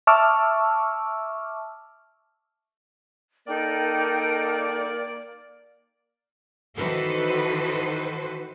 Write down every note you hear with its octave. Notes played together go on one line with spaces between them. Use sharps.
E5 A5 C#6 D6 E6 F6
A#3 D#4 A4 A#4 D5 G5
D#3 E3 F#4 A4 B4 C5